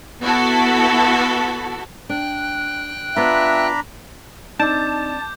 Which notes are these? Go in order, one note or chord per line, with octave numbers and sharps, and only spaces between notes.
B3 E4 F#4 A4
D4 G5 F#6
B3 D4 F4 E5 A#5 B5
C4 D4 D#4 A5 D6 G6